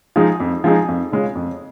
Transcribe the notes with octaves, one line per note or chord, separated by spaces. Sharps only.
F3 G#3 D#4 G#4
F2
F3 G#3 D#4 G#4
F2
C#3 G#3 C#4 F4
F2